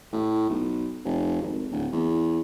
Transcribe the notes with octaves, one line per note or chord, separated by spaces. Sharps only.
A2
B1
F1
G#1
D1
E2